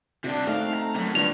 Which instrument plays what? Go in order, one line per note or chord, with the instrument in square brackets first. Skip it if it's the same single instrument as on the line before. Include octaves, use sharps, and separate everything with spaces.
[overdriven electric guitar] C3 D4 [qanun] F#4 D5 G5
[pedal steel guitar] A3 [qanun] C4 D#4 [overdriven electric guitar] F5
[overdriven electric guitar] A#5
[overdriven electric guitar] F#2 C3 [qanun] A#5
[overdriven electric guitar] G2 [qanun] D4 F4 C#5 [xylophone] F7